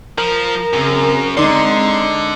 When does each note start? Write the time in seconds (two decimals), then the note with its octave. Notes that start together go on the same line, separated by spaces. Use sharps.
0.18 F3 A#4
0.73 F#2 C#3 C4 G#4
1.37 D3 G#3 C4 D#4 D5 C6